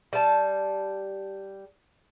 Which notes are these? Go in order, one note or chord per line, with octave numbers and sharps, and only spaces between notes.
G3 A5